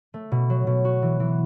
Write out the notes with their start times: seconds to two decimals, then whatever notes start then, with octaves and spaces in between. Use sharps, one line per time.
0.14 A3
0.32 B2
0.50 F#3
0.67 B2
0.85 F#4
1.02 E3
1.20 E3